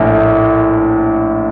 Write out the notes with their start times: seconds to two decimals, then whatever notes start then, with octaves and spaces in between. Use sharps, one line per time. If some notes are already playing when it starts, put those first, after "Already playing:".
Already playing: A#1 A2